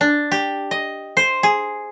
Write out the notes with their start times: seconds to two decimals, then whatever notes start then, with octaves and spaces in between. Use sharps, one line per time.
0.01 D4
0.32 G4
0.71 D#5
1.17 C5
1.43 G#4